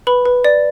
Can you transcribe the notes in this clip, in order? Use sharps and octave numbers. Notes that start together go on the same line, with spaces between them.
B4 B5
B4
D5